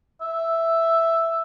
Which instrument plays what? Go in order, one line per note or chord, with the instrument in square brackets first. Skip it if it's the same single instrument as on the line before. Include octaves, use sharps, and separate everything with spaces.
[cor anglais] E5